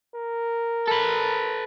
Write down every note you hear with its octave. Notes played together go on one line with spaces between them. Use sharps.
A#4
A4 B4